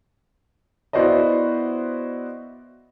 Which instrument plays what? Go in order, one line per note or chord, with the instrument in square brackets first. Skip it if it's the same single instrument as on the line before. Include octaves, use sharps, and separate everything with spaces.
[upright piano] B3 E4 F#4 C5 D5 D#5